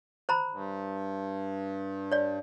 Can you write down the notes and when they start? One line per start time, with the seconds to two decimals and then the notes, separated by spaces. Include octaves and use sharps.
0.29 C5 A#5 B5
0.51 G2
2.12 C#5 D5